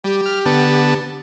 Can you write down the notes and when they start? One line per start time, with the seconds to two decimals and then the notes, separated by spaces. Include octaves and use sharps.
0.04 G3 G4
0.26 F6
0.46 D3 B3 A5